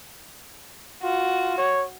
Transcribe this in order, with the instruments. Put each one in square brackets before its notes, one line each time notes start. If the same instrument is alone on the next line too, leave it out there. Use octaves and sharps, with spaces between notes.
[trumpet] F4 [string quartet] F#4
[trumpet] C#5